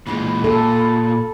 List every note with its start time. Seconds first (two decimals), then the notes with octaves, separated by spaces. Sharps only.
0.07 A#2 E3 G#3 B5
0.44 A#2 A4